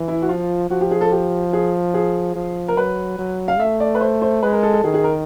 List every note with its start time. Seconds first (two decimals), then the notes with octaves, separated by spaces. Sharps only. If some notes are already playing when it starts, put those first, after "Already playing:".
Already playing: E3
0.08 E4
0.22 F#4
0.29 F3 F4
0.70 F3 F#4
0.81 G4
0.91 G#4
1.01 A4
1.12 G4
1.53 G#4
1.94 G#4
2.36 F3
2.68 A#4
2.77 F#3 B4
3.18 F#3
3.48 F5
3.59 A3 E5
3.80 D5
3.95 B4
4.01 C5
4.22 C5
4.43 G#3 B4
4.53 A#4
4.63 A4
4.73 A4
4.84 D#3 G#4
4.94 G#4
5.04 A#4